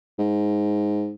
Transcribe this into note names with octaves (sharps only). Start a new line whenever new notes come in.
G#2